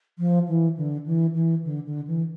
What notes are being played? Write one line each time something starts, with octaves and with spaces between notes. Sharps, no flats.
F3
E3
D3
E3
E3
D3
D3
E3